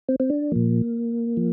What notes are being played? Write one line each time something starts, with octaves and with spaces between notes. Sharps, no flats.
C4
C4
D4
A#2 F3 A#3
F3